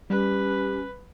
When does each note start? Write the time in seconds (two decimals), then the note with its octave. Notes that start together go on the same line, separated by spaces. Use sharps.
0.10 G3 C#4 G4 B4